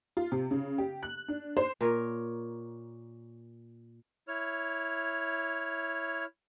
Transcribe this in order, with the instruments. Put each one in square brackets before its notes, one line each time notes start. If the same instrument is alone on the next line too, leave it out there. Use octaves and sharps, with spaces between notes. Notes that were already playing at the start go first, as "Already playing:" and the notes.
[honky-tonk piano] F4
C3
C#3
G4
F#6
D4
C5
[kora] A#2 A#4 C#5
[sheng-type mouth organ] E4 C#5 F6